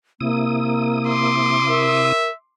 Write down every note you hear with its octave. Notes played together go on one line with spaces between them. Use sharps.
C3 A#3 E4 D#6
C6 D6
A#4 E5